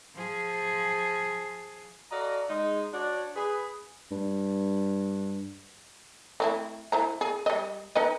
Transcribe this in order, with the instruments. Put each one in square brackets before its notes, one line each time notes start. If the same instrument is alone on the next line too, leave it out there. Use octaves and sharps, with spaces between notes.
[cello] F3 G#4
[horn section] F#4 A4 D5 D#5 F5 A#5
G#3 D#4 D#5
D4 F#4 C#5 D5
G#4 B4
[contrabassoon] G2
[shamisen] A3 C4 E4
E4 C5 A#5
G#4
G3 D#5
D#4 B4 D#5